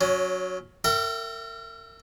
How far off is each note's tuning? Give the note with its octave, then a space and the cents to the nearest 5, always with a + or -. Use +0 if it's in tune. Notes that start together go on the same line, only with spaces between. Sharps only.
F#3 -10 C#4 +20
A#4 -35 E5 +20 G5 -30